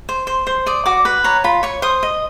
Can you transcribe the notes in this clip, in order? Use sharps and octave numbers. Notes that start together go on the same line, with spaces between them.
C5
C5
C5
D5 D#6
F#4 D6
B4 B5
C#5 A#5
F4 B5
C#5 C#6
C5 D#6
D#5